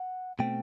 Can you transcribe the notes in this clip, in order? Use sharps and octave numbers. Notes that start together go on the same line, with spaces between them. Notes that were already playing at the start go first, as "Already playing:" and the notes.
Already playing: F#5
B2 A3 C4 G5